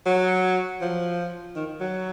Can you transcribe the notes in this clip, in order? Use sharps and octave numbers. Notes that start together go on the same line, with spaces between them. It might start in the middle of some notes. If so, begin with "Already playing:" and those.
F#3
F3
D#3
F#3